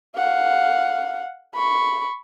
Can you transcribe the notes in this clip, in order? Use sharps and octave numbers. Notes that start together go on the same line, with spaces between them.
F5 F#5
B5 C#6